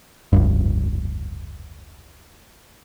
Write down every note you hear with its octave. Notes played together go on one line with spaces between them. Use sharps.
F1 C#2 G2